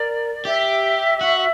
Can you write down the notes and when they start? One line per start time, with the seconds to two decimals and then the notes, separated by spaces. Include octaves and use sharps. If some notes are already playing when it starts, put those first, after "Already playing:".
Already playing: A#4 D5
0.45 G4 E5
1.21 F#4